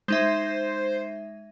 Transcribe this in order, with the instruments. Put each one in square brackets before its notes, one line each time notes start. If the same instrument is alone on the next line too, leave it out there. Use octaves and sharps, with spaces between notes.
[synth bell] G#3 D#4 E5 [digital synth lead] C5